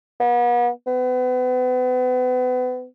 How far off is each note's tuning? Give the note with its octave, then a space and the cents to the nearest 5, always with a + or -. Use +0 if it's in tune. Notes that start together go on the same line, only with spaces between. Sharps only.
B3 -40
B3 +35